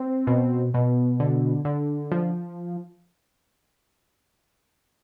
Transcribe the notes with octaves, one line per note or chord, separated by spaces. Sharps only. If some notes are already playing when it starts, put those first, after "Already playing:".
Already playing: C4
B2
B2
D3
D3
F3